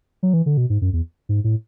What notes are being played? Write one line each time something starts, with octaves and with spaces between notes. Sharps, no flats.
F#3
E3
D3
B2
G#2
F#2
E2
G#2
A2